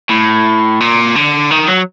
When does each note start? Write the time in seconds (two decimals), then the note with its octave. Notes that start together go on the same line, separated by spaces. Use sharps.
0.11 A2
0.80 A#2
1.16 D3
1.51 D#3
1.68 F#3